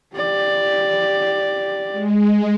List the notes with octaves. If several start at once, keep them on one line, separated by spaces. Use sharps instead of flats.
G4 D5
G#3